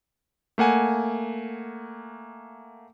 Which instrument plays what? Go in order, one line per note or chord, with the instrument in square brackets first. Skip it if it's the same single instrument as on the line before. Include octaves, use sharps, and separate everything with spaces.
[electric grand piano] A3 A#3 F#5 G#5